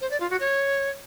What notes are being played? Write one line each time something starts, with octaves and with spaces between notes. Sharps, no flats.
C5
D5
F4
F#4
C#5